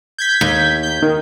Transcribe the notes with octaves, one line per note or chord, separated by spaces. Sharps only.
G6 G#6 B6
D#2
G6
D#3